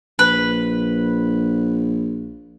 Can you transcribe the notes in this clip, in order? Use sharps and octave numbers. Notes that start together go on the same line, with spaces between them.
A#1 B4